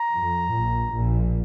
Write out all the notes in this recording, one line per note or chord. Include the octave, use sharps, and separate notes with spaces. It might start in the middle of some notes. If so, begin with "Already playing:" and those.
Already playing: A#5
F2
A#1 A#2
A#1 A#2